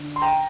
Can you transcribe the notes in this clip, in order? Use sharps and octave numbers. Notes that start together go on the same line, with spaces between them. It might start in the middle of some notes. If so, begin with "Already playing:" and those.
Already playing: D3
C6
G5 A#5